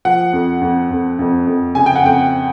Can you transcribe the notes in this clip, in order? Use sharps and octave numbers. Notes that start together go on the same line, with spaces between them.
F3 F#5
F2
F2
F2
F2
F2
C#3 G#5
G5
F#5
F2 G5